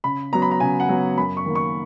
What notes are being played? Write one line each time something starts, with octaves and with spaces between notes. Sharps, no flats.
C#3 B5
F#3 B3 A#5
B5
A#5
C#3 G#5
F#5
F#3 B3
F#2 B5
C#6
D#3 A#3
C#6